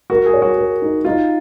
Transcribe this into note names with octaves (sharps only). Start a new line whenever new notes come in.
F#4 A#4
G#4
C#5
F#4
A#4
D#4
D#4 F4